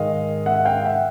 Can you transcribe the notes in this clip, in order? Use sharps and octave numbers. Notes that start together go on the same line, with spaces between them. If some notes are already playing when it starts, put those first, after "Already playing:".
Already playing: G#2 D#3 G#3 D#5 F5
E5 F#5
F5 G5
E5 F#5